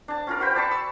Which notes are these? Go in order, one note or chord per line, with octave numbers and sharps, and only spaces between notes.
D4 A5
C#4 F4 A#4
F#4 B4 C5 G5
D5 A5 B5 C#6
E6